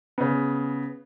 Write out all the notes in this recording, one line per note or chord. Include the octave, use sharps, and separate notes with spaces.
C#3 B3